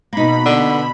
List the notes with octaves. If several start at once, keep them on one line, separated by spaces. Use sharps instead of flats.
B2 A#3 D#4 B5
D3